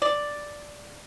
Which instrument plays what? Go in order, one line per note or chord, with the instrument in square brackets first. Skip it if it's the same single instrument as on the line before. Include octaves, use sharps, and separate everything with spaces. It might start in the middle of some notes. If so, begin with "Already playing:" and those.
[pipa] D5